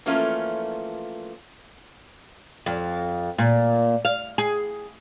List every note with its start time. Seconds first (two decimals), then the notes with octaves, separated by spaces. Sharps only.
0.06 E3 F3 A3 A#3 C#4 F4
2.66 F2
3.38 A#2
4.05 F5
4.38 G#4